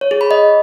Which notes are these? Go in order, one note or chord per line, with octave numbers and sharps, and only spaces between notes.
C#5
G#4
B5
D#5